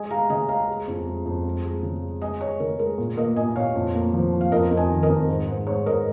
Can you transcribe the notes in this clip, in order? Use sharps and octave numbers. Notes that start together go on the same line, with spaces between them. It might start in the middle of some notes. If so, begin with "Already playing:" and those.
Already playing: G#3 D#5 G#5
G#3 F5 A#5
C#3 D#5 G#5
G#3 F5 A#5
G#3
F2
G#3
F2
G#3
G#3
C#3
G#3
G#3 D#5 G#5
G#3 C#5
C#3 A#4
G#3 A#4
A#2
A#3 A#4 D#5
A#2 D#5 G#5
A#2 C#5 F5
F2
A#3
F3
F3
F5
F2 A#4 D#5
F2
D#5 G#5
D#3
A#4 D#5
F2
G#2
G#2
G#2 C#5
G#2 A#4 D#5